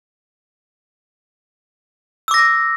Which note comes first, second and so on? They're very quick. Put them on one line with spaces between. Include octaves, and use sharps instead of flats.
E6 D6 A#6